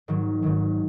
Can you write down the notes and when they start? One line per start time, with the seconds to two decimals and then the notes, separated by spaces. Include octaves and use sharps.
0.08 G#2 D#3 F#3
0.42 G#2 D#3 F#3